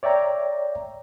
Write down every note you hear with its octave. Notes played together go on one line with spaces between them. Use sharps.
C#5 D5 E5 G5 A#5